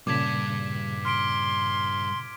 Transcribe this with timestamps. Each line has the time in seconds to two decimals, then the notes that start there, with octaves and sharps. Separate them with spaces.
0.07 G2 A#2 C#3 A5 D6 G#6 B6
1.05 C6 F6 B6 D7